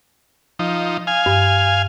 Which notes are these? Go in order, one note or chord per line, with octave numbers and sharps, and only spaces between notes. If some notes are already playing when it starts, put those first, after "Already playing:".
F3 D#4
F5 G#5
G2